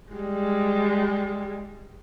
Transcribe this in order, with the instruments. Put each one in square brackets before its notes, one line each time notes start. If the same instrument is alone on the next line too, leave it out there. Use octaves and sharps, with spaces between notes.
[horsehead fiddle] G3 G#3